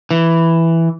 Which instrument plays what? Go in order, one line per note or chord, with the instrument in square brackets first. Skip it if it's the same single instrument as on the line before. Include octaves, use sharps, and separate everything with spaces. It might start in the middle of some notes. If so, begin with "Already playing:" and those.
[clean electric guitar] E3